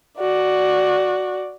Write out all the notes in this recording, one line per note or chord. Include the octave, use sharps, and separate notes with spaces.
F#4 D5